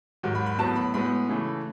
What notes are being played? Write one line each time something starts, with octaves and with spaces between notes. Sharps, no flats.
G#2 D#3 F#3
B5
B5
A2 F#3 B3 A5
B5
A2 G#3 B3 B5
C#3 E3 A3